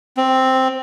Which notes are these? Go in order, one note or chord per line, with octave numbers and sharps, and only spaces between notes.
C4